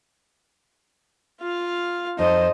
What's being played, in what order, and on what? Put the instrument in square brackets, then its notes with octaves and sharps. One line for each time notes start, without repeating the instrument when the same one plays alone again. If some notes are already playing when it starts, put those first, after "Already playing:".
[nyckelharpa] F4 F5
[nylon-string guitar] F2 [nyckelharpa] D#4 C5 [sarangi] D#5